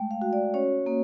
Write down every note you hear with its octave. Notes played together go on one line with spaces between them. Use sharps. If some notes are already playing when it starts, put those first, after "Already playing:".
Already playing: G#3 A3 G5
F5
F#4
D5
C#4 C#5
A#3